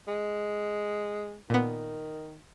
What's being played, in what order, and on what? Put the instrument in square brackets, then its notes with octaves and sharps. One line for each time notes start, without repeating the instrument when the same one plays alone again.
[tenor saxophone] G#3
[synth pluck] A#2 B3 [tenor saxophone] D#3